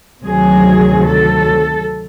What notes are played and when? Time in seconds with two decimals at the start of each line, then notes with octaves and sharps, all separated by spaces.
0.23 D2 C3 D#3 F#3 G#4
1.03 A4